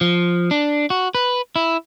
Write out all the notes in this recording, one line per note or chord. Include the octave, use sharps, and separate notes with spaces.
F3
D4
F#4
B4
E4